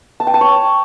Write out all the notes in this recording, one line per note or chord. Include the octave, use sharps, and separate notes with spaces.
A5
G5
A5
C#5